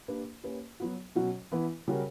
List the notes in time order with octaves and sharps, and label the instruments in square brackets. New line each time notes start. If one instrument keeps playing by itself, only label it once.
[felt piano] A#3 D4 G4 B4
A#3 C#4 G4 B4
F#3 B3 F#4
B2 F#3 C#4 F#4
E3 B3 E4 B4
C#3 G3 C#4 F#4 A#4